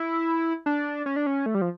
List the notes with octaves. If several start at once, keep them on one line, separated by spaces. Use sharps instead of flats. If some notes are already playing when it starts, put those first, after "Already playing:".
Already playing: E4
D4
C#4
D4
C#4
A3
G3
F3